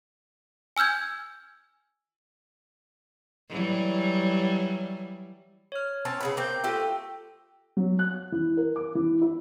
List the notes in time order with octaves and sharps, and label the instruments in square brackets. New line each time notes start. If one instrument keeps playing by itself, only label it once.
[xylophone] G#5 E6 F6 G6 G#6
[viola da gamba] E3 F#3 G3
[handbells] C#5 F6
[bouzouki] C4 C#4 A5
C#3 G#4 B4
[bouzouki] A#3 C4 [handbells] D6 G6
[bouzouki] A3 G4 [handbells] F4 A4
[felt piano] F#3
F#6
E3
A#4
D6
E3
E4